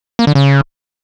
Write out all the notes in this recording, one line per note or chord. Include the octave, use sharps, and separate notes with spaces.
A#3
D3
C#3